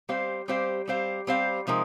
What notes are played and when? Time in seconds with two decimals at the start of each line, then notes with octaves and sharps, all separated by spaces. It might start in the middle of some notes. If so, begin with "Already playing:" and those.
0.09 G3 C4 G4 C5 F5
0.48 G3 C4 G4 C5 F5
0.87 G3 C4 G4 C5 F5
1.27 G3 C4 G4 C5 F5
1.67 C3 F3 G#3 D#4 A#4